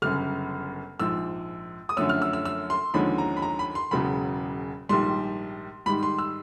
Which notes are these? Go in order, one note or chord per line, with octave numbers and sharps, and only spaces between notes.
G1 F#2 C#3 F6
A#1 G#2 F3 E6
D#6
F#2 D3 F3 A3 C#4 E6
F6
E6
E6
E6
C6
D#2 D3 F3 G#3 C#4 B5
A#5
B5
A#5
B5
C6
E1 E2 C#3 F#3 B5
A#1 G#2 D#3 G3 C6
G#2 D#3 G3 B5
C6
E6